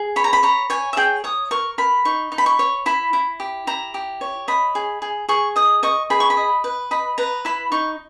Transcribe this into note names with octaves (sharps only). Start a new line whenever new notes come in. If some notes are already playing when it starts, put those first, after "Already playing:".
Already playing: G#4
C#5 B5
A#5
B5
C#5 A#5
C#5 G#5
E5
G#4 G5
C#5 D#6
A#4 C#6
A#4 B5
D#4 C#6
D#4
B5
C#6
C#5
E4 B5
E4
G4
E4 A#5
G4
C#5
D#5 B5
G#4
G#4
G#4 C#6
D#5 D#6
D#5 C#6
G#4 B5
C#6
B5
D#5
B4
D#5 B5
B4 A#5
E4 B5
D#4 C#6